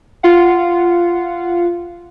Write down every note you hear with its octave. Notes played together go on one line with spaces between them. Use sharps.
F4 F5 F#5